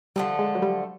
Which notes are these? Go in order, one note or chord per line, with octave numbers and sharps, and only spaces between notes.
D3 F3 G3 A3
G#3
F#3
G3